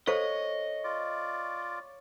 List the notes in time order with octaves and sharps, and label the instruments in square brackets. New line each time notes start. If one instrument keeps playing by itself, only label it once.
[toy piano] A4 C5 F5 [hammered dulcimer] C#5 [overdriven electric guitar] D#5
[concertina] F4 D5